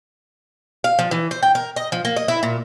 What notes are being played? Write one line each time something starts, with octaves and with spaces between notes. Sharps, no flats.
F5
F3
E3
C5
G5
A#4
D#5
F3
A#3
D#5
E4
A#2